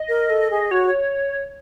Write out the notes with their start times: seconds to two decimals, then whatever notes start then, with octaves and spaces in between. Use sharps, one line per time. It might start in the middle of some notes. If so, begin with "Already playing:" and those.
Already playing: D#5
0.09 A#4
0.30 A4
0.51 G#4
0.71 F#4 C#5